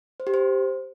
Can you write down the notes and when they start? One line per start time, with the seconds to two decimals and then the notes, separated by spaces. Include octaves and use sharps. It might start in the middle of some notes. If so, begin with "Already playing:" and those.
0.20 C5
0.27 G4
0.34 C5